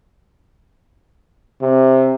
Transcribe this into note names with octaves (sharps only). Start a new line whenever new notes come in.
C3